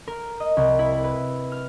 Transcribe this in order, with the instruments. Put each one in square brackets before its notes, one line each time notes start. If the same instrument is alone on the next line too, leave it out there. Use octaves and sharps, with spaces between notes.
[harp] A#4
D#5
C2
E4
B4
F6